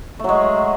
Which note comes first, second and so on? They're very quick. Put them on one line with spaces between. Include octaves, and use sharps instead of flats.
A3 F#3 G#3